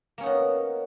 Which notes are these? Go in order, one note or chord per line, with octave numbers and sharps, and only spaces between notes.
A#3 B3 C#4 D#4